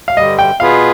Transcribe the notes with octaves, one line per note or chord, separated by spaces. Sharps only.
F5
G2 D3 G3 D#5
G5
B2 B3 F4 G#4 B4 F5